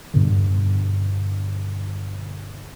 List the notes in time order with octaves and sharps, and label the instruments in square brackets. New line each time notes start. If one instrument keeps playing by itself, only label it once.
[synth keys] G2 B2 D3